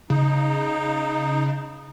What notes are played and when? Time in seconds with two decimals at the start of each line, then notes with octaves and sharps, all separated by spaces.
0.10 C#3 D#4